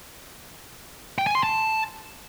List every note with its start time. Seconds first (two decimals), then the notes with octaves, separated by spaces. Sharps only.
1.18 G5
1.27 G#5
1.35 C6
1.43 A5